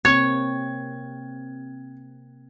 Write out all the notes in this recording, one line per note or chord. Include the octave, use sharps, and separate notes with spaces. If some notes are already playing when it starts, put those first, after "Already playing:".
C3 A#3 C4 C#5 G#6